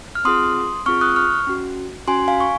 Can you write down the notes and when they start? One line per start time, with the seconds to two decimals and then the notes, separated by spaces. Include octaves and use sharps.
0.15 F6
0.25 C4 F4 G#4 C6 D#6
0.86 C4 F4 G#4 C#6 F6
1.01 D#6 F#6
1.16 C#6 F6
1.47 C#4 F#4
2.08 C#4 F#4 G#5 C6
2.28 F5 G#5
2.41 C#6